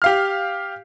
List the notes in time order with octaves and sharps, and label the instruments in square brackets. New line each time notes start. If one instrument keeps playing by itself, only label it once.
[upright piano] G4 F5 F6